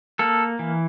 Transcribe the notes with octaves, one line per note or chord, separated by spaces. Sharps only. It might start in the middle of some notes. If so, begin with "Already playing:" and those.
A#3 A4
E3